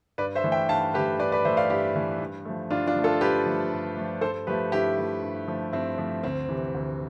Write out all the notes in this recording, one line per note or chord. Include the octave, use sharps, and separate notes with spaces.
G2 B4 D5
C5 E5
E3 A3
E5 G5
G2 F5 A5
E3 A3 G4 B4
G2 B4 D5
B4 D5
E3 A3 C5 E5
D5 F5
G2 E4 G4
E3 A3
G2
F3 A3
G2 D4 F4
D4 F4
F3 A3
F4 A4
G2 G4 B4
F3 A3
G2
F3 A3
G2 A4 C5
F3 A3 G4 B4
G2 E4 G4
F3 A3
G2
F3 A3
G2 C4 E4
F3 A3
D2 C4
C3 E3
D2